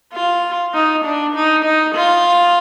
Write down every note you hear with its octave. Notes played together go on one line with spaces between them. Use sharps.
F4
D#4
D4
D#4
D#4
F4